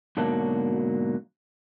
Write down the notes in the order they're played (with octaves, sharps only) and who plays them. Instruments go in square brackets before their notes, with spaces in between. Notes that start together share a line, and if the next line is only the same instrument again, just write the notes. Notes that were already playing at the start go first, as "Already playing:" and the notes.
[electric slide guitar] G#2 B2 D3 F#3 A#3 A5